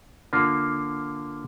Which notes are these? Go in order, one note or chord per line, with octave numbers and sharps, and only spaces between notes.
D3 A#3 F4